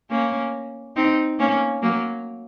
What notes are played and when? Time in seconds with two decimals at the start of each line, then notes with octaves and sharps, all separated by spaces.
0.10 A#3 C#4
0.96 C4 D#4
1.39 A#3 C#4
1.82 F#3 A#3